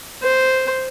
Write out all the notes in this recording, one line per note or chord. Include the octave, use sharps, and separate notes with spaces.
C5